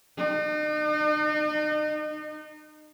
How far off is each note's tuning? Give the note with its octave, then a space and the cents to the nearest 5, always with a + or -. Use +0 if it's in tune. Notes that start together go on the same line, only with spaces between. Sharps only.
D#4 -40